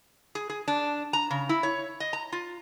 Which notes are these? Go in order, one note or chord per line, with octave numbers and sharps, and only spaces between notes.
G#4
G#4
D4
A#5
C#3
E4
C#5
D#5
A#5
F4